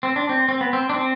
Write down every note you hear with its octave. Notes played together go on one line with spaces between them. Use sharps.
C4
D4
C4
C4
B3
C4
D4
C4